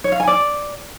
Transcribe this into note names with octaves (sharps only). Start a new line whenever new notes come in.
C#5
F5
G#5
D5